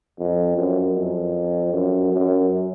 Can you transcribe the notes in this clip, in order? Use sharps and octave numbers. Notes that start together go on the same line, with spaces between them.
F2
F#2
F2
F#2
F#2